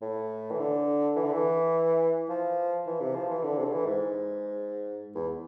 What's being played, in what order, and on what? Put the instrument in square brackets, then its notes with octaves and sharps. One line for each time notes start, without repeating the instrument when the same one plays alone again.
[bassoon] A2
E3
D3
E3
D3
E3
F3
E3
C3
F3
E3
D3
C3
D3
E3
G#2
E2